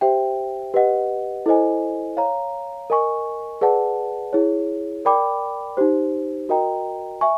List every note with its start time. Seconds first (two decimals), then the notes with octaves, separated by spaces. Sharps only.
0.01 G4 C5 E5 G5
0.74 G4 B4 D#5 F#5
1.46 E4 A4 C5 D#5 G#5
2.17 C#5 F5 A#5
2.90 A#4 D#5 G#5 C#6
3.61 G#4 B4 D5 F#5 A5
4.33 E4 G#4 C#5
5.05 A#4 D5 G5 B5 D6
5.77 D#4 G4 C5
6.49 F#4 A#4 D#5 G5 A#5
7.21 E5 G#5 C#6